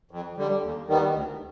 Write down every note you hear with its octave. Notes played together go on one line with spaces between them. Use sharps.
F2
D3 G3
D#2
D#3 G3 B3
D2